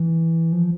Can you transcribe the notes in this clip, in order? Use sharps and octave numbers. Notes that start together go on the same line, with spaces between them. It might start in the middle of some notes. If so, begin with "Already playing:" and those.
Already playing: E3
F3